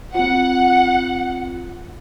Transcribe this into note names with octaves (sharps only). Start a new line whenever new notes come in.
C4 F4 F#5